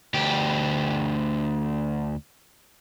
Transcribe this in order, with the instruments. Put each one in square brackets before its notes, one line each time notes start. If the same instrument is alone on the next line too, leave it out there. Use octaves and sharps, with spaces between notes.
[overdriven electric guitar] D2 G4